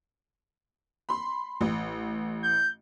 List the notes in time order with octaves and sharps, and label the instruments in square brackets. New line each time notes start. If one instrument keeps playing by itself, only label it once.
[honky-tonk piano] B5 C6
A1
[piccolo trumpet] G6